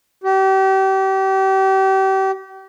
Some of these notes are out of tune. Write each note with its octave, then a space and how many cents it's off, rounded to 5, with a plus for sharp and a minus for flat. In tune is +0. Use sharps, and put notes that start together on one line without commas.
G4 -35